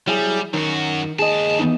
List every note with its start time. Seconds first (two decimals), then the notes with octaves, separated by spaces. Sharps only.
0.08 F#3 G3 E4 G#4
0.54 F#2 D#3 F#4
1.19 D#2 G#4 D#5 A5
1.59 E3 B3 D#4